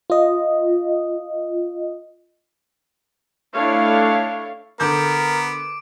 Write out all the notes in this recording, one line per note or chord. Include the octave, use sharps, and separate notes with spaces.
F4 D#5
A3 D4 E4 C#5 F5
D3 B3 A#4 D6 G6 D7